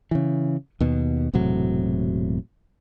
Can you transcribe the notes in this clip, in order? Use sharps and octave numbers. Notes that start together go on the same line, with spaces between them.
C#3 E3
D#2 B2
E1 A2 C3 F#3